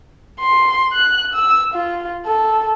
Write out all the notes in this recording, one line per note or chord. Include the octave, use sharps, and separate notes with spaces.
C6
F#6
E6
F4
A4